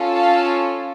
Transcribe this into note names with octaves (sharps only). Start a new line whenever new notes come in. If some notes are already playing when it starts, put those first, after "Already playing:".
Already playing: C#4 F4 A4
F5 A5